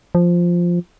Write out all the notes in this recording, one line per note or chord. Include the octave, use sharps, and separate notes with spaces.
F3